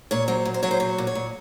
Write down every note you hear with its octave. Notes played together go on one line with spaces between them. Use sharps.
A#2 C#5
F#3 C5
A#2
C5
F#3 C#5
C5
A#2 C#5
A#2
C#5
A#2